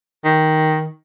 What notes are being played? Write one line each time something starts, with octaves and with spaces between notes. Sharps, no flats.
D#3